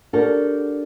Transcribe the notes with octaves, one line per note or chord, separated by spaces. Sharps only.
D4 F#4 G4 A4 A#4 D5